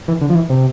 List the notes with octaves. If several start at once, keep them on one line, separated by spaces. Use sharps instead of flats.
E3
D3
F3
E3
C3